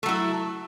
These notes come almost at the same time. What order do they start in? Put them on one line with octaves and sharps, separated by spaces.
A3 F#3 E4